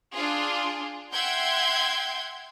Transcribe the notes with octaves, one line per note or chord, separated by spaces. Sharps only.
D4 F4 G#4
E5 F#5 G5 C6 G6 G#6